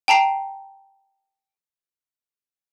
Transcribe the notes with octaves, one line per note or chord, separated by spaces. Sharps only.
G5 A5 A#5 C7 D7